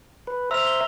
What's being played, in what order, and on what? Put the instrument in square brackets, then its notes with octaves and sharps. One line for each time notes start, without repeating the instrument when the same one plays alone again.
[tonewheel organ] B4
[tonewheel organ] C5 E5 A#5 [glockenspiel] E6 F6 F7
[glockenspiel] G7